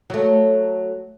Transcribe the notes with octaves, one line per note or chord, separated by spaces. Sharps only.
F#3 A3